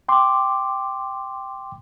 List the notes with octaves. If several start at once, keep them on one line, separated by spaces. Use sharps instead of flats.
G5 C6 D6